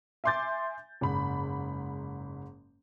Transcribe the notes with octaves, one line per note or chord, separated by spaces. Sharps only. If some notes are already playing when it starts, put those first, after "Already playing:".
E5 G#5 C6 D6 G6 A6
F#1 G#2 B5